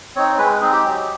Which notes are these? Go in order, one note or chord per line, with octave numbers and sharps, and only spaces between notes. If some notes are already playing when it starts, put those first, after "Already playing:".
C4 D#4 C#5
G#3 B4
C4 D#4 G#4
G4
F#3